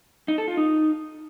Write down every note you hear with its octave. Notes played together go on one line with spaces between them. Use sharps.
D#4
A4
F4
D#4